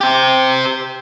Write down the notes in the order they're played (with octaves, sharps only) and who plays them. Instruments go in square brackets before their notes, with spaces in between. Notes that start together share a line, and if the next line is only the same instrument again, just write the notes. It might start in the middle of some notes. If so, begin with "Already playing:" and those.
[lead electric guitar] G4 C5